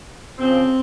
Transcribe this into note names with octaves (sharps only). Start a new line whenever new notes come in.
C#3 F3 C4